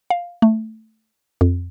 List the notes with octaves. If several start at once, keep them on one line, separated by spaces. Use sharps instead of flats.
F5
A3
F2